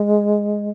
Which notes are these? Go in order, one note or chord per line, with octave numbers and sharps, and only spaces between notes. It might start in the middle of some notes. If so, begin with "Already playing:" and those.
Already playing: G#3